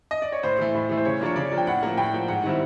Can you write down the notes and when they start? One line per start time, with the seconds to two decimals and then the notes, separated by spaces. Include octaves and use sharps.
0.11 D#5
0.22 D5
0.32 C#5
0.43 A2 C5
0.58 E3 A3
0.74 A2
0.89 E3 A3
0.97 C5
1.05 C#3 C#5
1.21 F3 A#3 D4 C#5
1.36 C#3 D5
1.51 F3 A#3 D4
1.58 G5
1.67 A2 F#5
1.83 F3 A#3
1.97 A2 G5
2.14 F3 A#3
2.28 G#2 F#5
2.44 D#3 G3 C4 E4